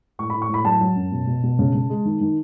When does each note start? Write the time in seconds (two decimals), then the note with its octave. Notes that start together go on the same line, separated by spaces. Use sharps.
0.19 A2 C#6
0.30 A2 B5
0.42 C#6
0.49 A2 B5
0.65 F#3 A5
0.81 F#3
0.96 F#2
1.12 B2
1.27 B2
1.43 B2
1.59 C#3
1.75 C#3
1.90 G#3
2.05 D#3
2.21 D#3